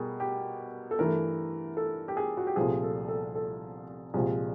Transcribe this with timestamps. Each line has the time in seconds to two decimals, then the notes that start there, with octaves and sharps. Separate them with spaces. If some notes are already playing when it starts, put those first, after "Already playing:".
Already playing: B2 G3 G#4 A#4
0.20 G4
0.91 A4
0.99 G2 E3 A3 A#4
1.77 A4
2.08 G4
2.17 G#4
2.37 F#4
2.47 G4
2.56 C2 A#2 F3 A3 G#4
2.83 A4
3.08 A4
3.35 A4
4.14 C2 A#2 F3 G#3 G#4